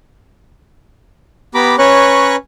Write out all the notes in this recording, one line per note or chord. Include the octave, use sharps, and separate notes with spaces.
B3 G4 A#5 B5 D6
C#4 B4 C#5 A#5 C#6 F#6